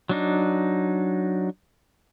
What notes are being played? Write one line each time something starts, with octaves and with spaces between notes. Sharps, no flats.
F#3 D4 D#4